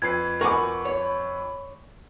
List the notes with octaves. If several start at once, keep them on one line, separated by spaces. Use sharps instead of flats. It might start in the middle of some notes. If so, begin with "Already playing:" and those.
F2 B4 G#6 C7
A#4 F#5 G#5 B5 C#6 D6
C#5